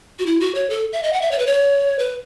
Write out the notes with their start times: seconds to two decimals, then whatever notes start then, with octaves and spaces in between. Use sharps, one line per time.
0.19 F#4
0.26 E4
0.40 F#4
0.55 C#5
0.70 A4
0.93 E5
1.03 D#5
1.13 F#5
1.21 E5
1.31 C#5
1.39 B4
1.46 C#5
1.99 B4